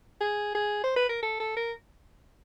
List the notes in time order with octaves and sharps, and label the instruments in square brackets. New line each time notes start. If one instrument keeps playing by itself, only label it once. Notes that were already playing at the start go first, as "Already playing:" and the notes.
[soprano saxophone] G#4
G#4
C5
B4
A#4
A4
A4
A#4